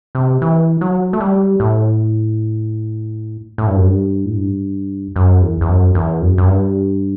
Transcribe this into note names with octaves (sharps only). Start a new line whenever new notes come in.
C3
E3
F#3
A3
G3
A2
A2
G2
F#2
G2
A2
G2
F#2
E2
E2
F#2
E2
F#2
F#2
G2